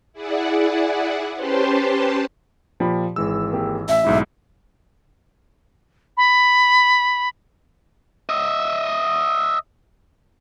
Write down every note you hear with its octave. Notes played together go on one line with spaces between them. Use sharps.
E4 G#4 D5 F#5
C#4 G4 B4 C5 A5 C6
A#2 F3 G4 B5
G#1 E3 G#3 E6
A#3 G4 G#4
A1 E5
B1 G#2 E4
B5
D#5 E5